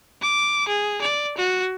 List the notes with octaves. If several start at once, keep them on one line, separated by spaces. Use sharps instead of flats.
D6
G#4
D5
F#4